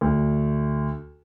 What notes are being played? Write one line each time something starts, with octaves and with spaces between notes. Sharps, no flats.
D2